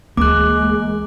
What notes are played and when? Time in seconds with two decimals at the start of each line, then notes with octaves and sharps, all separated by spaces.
0.17 D2 E3 G#3 A#3 D6 F#6